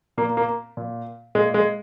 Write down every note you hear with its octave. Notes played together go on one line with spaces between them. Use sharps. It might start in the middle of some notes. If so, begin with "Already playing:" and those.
A#2 A#3
A#3
A#2
A#2 G#3
G#3